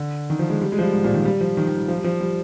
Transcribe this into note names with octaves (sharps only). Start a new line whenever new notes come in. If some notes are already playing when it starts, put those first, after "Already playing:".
Already playing: D3
D#3
F3
G#3
G3
G#3
F3
G3
G#2
A#2
D#3
G3
F3
D#3
D#3
G3
F3
G3
F3
G3